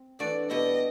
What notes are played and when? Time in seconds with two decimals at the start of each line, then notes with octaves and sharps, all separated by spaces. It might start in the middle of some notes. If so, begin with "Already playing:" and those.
Already playing: C4
0.19 E3 A3 D4 F#4 D5
0.50 B2 G3 B3 E4 G4 D#5